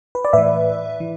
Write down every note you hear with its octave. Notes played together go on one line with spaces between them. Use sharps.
B4
D5
A2 E3 B4 E5
E3